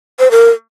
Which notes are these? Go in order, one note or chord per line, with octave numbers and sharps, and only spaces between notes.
C5
A#4